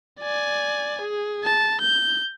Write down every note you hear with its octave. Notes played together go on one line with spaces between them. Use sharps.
D5 G#5
G#4
A5
G6